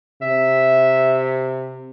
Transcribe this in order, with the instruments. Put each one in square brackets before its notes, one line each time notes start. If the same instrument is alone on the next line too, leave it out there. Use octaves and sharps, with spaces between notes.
[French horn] C3 [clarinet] E5